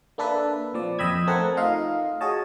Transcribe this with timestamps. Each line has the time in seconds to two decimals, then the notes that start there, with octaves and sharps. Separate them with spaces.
0.18 A#3 D4 A4 B4 E5
0.74 A#2 F3 C4 D5
0.99 F2 D#5 G5 B5 E6 G#6
1.27 A3 C4 A4 A#4 F#5
1.57 A3 D#4 F4 D#5 F5
2.21 F#4 G#4 C#5 D#5 A5